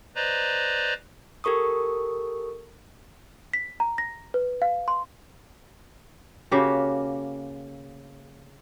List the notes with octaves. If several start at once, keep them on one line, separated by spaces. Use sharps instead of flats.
B4 C5 D5 D#5 A#5
G4 A4 A#4 C#6 D#6
B6
A#5
A#6
B4
F5
C6
C#3 A#3 F#4 G4